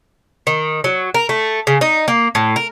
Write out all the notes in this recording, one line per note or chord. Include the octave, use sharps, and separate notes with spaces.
D#3
F#3
A#4
A3
C#3
D#4
A#3
A2
A#4